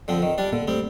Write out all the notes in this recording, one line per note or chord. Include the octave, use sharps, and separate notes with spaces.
D3 F3 C4
D#3
G3 D4
A#2 D3 A#3
G3 A3 C4